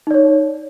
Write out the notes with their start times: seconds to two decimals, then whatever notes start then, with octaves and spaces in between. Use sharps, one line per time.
0.07 D#4
0.11 D5
0.14 C#5